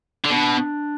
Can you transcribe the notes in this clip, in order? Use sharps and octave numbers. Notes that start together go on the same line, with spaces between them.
D3
B2 D4